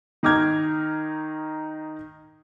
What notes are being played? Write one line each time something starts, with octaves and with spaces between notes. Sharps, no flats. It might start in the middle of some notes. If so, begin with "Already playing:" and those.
D#3 D#4 D6 F6 G#6